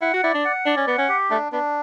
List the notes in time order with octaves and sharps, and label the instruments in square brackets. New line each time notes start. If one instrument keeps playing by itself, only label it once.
[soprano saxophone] E4 [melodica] F#5
[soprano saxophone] F#4
[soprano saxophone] E4 [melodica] D5
[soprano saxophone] D4
[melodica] F#5
[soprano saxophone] D4 [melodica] D5
[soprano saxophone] C#4
[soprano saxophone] B3 [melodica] F#5
[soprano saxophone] C#4
[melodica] G4
[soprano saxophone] A3 [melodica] D4
[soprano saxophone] B3 [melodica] D4